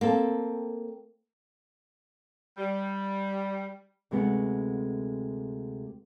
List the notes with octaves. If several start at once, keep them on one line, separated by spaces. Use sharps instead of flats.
A#3 C4 A4
G3
D2 C3 G#3 A3 B3 F#5